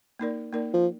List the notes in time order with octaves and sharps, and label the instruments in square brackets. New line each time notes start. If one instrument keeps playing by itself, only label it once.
[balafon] A#3 D#4 A#4 D5
A#3 D#4 A#4 D5
[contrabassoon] F3